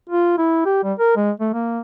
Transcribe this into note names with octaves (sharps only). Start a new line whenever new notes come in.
F4
E4
G4
G3
A#4
G#3
A3
A#3